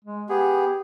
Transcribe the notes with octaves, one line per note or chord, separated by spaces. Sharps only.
G#3
B3 G4 G#4